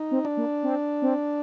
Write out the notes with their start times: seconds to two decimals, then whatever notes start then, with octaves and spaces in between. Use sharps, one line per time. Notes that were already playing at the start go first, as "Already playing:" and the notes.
Already playing: D#4
0.11 C4
0.25 D4
0.37 A#3
0.63 C4
1.02 C4